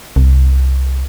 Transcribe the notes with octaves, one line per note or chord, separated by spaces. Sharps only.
C2